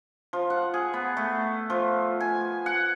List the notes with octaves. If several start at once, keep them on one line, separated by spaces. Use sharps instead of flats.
F3
F#5
G#4
B3
A3
F3
G#5
F#5